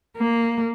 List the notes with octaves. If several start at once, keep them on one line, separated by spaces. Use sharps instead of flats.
A#3